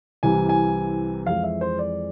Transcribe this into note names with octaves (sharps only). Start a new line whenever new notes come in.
C2 C3 E3 G#5
G#5
F2 E3 G#3 F5
E5
C5
D5